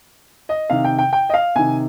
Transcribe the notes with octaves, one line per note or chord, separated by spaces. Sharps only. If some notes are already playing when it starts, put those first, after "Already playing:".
D#5
C3 D#3 F5
G5
G5
G5
D#5
F5
C3 D#3 G#5